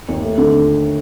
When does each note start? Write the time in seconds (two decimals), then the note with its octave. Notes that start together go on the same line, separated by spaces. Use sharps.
0.08 D#2
0.22 A3
0.38 D3